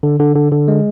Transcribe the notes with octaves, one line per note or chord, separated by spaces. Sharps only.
D3
D3
D3
D3
G#3